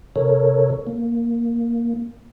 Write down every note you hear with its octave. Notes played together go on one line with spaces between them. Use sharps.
C3 A4 A#4 C#5
A#3